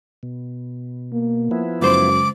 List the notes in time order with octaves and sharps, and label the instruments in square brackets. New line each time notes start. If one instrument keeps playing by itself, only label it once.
[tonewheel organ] B2
[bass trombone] A#3
[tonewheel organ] F3 B3 E4
[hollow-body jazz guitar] C#2 C5 [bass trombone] F#2 [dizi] D6